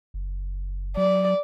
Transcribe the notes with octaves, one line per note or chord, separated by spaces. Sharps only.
F#1
F#3 D5